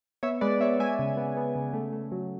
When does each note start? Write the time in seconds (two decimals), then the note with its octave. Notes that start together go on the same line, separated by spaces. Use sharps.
0.23 B3 C#5 E5
0.41 G#3 B4 D5
0.60 B3 C#5 E5
0.79 G#3 E5 G#5
0.99 C#3
1.17 B3
1.37 B3
1.55 C#3
1.73 A3
1.92 A3
2.12 F#3